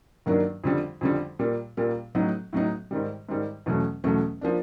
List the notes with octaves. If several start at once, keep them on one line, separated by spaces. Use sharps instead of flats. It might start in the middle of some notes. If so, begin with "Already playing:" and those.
G2 D#3 F#3 A#3 D4
F2 D3 G3
F2 D3 G3
A#2 G3 A#3
A#2 G3 A#3
A2 F#3 B3 D#4
A2 F#3 B3 D#4
G#2 D#3 G3
G#2 D#3 G3
E2 B2 F#3 A3 C#4
E2 B2 F#3 A3 C#4
F3 A#3 D4